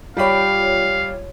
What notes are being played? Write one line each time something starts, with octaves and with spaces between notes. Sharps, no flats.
G3 F4 G4 C#5 F5 B5